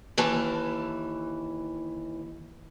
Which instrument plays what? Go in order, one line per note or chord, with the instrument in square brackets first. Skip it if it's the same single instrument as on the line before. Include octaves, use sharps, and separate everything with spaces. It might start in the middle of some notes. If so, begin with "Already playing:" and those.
[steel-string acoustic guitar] D#2 E3 A5